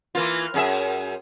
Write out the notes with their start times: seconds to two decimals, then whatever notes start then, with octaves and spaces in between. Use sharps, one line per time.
0.15 E3 A#3 F4
0.54 F#2 G#4 E5